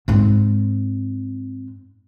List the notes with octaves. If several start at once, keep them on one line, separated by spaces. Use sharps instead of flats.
G#2 C4